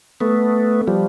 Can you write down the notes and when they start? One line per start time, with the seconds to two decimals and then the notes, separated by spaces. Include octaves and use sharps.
0.21 A3 B3
0.87 F3 G3